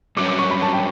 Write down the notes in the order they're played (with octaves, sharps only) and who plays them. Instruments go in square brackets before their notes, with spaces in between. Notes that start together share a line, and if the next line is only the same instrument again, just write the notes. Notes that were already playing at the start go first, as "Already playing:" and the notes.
[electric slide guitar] G2 F#3 C#4 [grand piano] D6
[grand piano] D6
C#6
B5
A5
G5